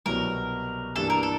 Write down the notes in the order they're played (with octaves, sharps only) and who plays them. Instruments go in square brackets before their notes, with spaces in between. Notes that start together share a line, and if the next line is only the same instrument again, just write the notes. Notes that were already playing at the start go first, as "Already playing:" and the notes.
[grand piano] C2 B2 F#3 [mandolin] A#4
[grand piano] G2 E3 G3 A#3 D4 [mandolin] A4
[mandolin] A#4
A4